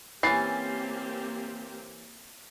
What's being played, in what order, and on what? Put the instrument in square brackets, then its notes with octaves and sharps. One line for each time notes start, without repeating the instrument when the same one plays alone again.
[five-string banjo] E3 C#4 [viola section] A#3 C4 G4 [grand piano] A6 C7